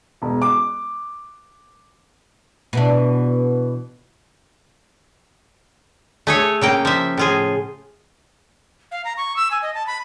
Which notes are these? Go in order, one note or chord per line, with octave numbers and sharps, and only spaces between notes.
E1
D6
B2 E3 D4
A3 G#4 C#5
C#3 A#3 G5
F3 E5
A2 F4 G#4
F5
A#5
C#6
E6
G#5
D#5
A5
B5